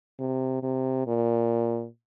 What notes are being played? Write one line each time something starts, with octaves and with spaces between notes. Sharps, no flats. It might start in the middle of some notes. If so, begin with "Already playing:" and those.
C3
C3
A#2